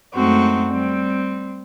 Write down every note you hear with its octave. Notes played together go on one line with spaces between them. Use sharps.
F#2 G#3 A3 C4 D#4 F#4
G3 C4